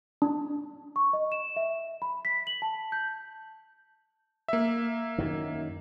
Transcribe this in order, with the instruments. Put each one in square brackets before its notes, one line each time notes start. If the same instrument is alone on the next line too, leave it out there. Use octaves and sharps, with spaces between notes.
[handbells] D4
[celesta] C#6
D#5
E7
E5
B5
B6
F#7
A5
G6
[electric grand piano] A#3 E5
[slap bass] F#2 D#3